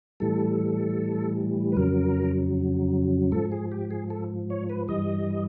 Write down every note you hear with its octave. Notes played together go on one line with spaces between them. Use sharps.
A2 E3 G3 A4
B4
F2 C#3 F#3 A#4
G#2 F3 A4
G#4
G4
G#4
A4
C#5
B4
G2 E3 G3 D#5